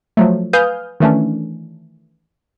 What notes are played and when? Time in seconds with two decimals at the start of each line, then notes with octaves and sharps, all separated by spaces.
0.17 F3 F#3 A3
0.53 B4 F5 G#5 D#6 F6 G6
1.00 D#3 E3 A3 C#4 D4